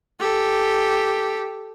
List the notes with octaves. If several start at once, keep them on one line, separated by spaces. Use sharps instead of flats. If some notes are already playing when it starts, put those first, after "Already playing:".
G4 A4